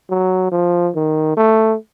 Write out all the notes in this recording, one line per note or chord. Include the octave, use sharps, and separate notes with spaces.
F#3
F3
D#3
A3